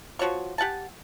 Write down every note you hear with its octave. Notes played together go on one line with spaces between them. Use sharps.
F3 F#4 C#5 C#6
G4 F#5 G#5 A5